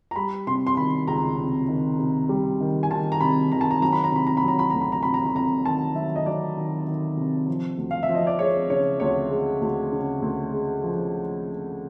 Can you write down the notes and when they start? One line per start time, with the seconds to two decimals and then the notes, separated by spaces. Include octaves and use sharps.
0.11 A#5
0.16 G3 B5
0.47 C3 C6
0.67 C6
0.77 D#3 B5
1.08 C#2 A#5
1.38 C3
1.68 D#3
1.99 C3
2.29 G3
2.61 D#3
2.83 G#5
2.91 D#3 A5
3.12 A#5
3.21 C3 B5
3.52 D#3 A#5
3.61 A5
3.71 A#5
3.82 F#3 A#5
3.93 B5
4.04 A#5
4.12 C3 B5
4.27 A#5
4.37 B5
4.44 F#3 A#5
4.59 B5
4.70 D2 A#5
4.81 B5
4.92 A#5
5.03 C3 B5
5.14 A#5
5.26 B5
5.34 C3 A#5
5.65 D#3 A5
5.95 F#3 E5
6.16 D#5
6.26 F#3 D5
6.57 D#3
6.87 D#3
7.17 C3
7.48 F3
7.78 D2
7.91 F5
8.03 E5
8.09 F3
8.15 D#5
8.27 D5
8.39 G#3 C#5
8.70 C#3 C#5
9.00 D2 C#5
9.31 G#3
9.61 D2
9.92 C#3
10.22 D2
10.53 G#3
10.84 F3